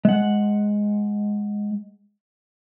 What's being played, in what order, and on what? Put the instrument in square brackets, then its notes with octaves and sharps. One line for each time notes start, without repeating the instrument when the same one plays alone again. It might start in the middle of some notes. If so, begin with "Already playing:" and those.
[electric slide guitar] G#3 F#5